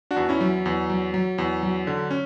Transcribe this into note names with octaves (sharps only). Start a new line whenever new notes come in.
D4 F#4
E2
C#4 E4
F#3
E2
F#3
F#3
E2
F#3
D3
C#4